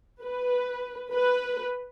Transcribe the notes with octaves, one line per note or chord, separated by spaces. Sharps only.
B4
B4